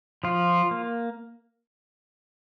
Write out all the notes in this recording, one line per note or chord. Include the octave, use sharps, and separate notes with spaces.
F3 F4
A#3